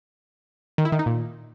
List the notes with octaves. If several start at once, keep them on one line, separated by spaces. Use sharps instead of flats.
D#3
E4
D#3
D#4
A#2